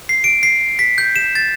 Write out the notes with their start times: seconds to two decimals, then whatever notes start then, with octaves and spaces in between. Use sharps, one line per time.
0.09 C7
0.24 D7
0.43 C7
0.79 B6
0.98 G6
1.16 E7
1.35 A6